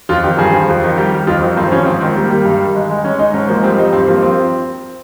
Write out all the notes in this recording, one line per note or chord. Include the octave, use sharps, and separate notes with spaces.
F2 F4
D#3 G4
G2 G#4
F3
F2
D#3
G3 G4
G3
F2 F4
D#3 C4
G2 C4
F3 C#4
G#2 C4
D#3 C4
G3 A#3
G3
G2
D#3
G#3
G#3 D#4
G#3 C#4
G#3 D#4
G#2 C#4
F3 A#3
G3 C4
G3 D#4
G2 C4
F3 A#3
C4